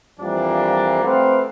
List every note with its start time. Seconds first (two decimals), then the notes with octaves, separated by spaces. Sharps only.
0.20 F2 E3 F3 G3 A#3 D4
1.04 A3 C4 B4 C5 F5 F#5